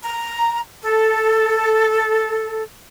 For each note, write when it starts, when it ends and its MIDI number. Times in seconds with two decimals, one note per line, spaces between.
0.01 0.60 82
0.82 2.61 69